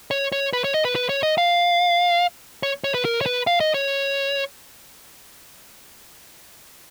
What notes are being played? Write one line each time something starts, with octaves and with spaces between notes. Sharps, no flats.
C#5
C#5
B4
C#5
D#5
B4
B4
C#5
D#5
F5
C#5
C#5
B4
A#4
C#5
B4
F5
D#5
C#5